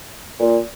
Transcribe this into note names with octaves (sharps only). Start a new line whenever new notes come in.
A#2